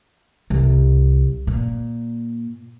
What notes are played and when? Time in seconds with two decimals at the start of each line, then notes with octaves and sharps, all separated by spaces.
0.50 C2
1.47 A#2